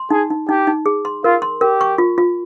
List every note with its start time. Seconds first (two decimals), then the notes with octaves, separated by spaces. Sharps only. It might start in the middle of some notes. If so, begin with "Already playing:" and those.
Already playing: C6
0.11 D#4 G#4
0.30 D#4
0.49 D#4 G4
0.67 D#4
0.86 G#4
1.05 C6
1.24 F4 A#4
1.42 C6
1.61 G4 A#4
1.81 C#6
1.98 F4
2.18 F4